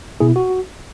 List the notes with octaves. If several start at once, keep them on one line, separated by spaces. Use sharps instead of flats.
B2 B3 E4 G#4
F#4